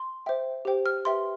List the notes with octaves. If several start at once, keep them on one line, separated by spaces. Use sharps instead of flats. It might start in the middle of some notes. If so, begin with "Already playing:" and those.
Already playing: C6
C5 E5 G5
G4 C5 G5
F6
G4 B4 E5 G5 C6